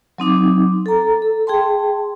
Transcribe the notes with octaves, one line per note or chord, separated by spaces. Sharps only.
F#3 C4 D#4 D6
A4 A#5
A4
G#4 G5 A5 C6